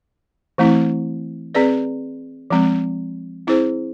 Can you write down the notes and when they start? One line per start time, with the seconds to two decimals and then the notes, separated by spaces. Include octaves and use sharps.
0.58 E3 A3 C4 E4
1.55 C4 G#4 B4 D5
2.50 F3 G#3 C4
3.47 C4 E4 G#4 C5